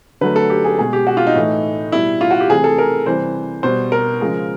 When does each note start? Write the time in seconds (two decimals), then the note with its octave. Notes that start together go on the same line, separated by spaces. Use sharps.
0.21 D3 F#3 A3 B4
0.36 A4
0.50 G4
0.65 G#4
0.78 B2 G#3 G#4
0.93 G4
1.07 F#4
1.17 F4
1.27 D#4
1.35 A2 E3 A3
1.92 B2 G3 E4
2.21 F4
2.31 F#4
2.40 G4
2.50 C3 E3 A3 G#4
2.64 A4
2.78 A#4
3.06 C3 E3 G3 C5
3.63 B2 G3 C5
3.92 A#4
4.21 C#3 F3 G#3